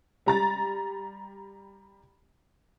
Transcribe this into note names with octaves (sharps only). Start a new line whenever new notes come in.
G3 A#5 A6